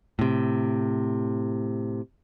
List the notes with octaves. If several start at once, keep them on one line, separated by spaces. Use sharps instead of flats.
A2 C3